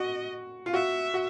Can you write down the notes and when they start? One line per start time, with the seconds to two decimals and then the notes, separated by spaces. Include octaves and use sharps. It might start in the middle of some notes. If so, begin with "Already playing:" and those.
Already playing: F#4 D#5
0.66 F4
0.73 F#4 E5
1.14 F#4